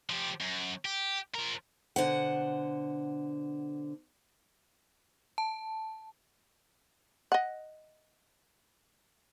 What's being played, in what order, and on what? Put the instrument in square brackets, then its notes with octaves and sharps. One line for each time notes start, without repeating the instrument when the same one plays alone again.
[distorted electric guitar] F3 G4
F#2
G4
F3 A#4
[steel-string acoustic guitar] B2 D3 C5 F#5
[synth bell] A5
[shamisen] D#5 F#5